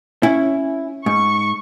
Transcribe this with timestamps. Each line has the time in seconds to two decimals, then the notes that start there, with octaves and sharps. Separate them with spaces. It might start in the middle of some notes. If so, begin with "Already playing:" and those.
0.23 C#4 E4
1.06 G#2 C#6